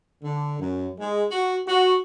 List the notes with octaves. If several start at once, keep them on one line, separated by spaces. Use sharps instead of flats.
D3
F#2
G#3
F#4
F#4